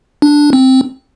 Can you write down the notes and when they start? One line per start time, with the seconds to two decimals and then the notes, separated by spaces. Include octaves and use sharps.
0.22 D4
0.53 C4